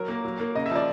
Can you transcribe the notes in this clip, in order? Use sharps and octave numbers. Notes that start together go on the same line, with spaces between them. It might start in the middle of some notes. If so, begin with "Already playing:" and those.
Already playing: F#3 A#4
A#3
F#3
A#3
C#3 D#5
E5
F3 D5